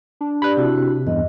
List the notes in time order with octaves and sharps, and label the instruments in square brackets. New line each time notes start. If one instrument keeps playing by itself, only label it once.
[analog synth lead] D4
[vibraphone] G4 D5 [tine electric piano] B5 F#6
[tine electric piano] C3 [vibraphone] E4 F#4
[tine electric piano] E2 G2 [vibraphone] D#5